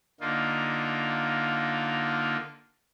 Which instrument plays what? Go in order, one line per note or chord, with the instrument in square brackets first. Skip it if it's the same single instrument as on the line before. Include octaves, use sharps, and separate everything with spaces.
[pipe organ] D3 A#3 D#4 F4